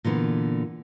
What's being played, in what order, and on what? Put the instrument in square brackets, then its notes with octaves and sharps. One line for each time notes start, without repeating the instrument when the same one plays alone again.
[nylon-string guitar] A#2 D3 E3 B3